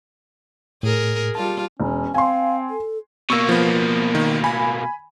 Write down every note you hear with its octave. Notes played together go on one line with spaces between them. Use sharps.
A2 G#4 A#4
G3 F4 A5
E1 C#4
C4 F5 G#5 C6
A4
B2 A#3 C#6 E6
F3 B3
D#3
G#5 B5